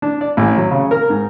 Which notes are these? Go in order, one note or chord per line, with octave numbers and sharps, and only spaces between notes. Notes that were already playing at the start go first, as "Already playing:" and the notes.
D4
D5
A1
F#3
C#3
A#4
G#2